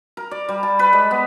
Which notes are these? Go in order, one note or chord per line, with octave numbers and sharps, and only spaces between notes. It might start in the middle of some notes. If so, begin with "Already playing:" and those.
A#4
D5
G3
A5
B4
G#3
B3